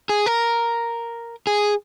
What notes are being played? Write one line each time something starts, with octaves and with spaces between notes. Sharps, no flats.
G#4
A#4
G#4